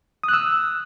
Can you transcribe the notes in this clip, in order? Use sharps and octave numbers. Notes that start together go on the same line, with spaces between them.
D#6 E6 F#6